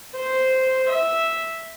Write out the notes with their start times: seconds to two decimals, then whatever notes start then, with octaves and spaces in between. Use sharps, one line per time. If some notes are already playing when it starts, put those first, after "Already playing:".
0.16 C5
0.90 E5